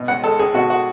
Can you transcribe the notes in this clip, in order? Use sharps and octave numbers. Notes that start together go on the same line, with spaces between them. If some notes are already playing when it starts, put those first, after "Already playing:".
Already playing: B2
C#2 F#5
G#3 A4
C#2 G#4
B2 F#4
F#4